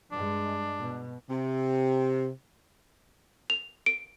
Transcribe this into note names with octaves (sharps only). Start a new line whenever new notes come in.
G2 G#3 D4
B2
C3
F7
D7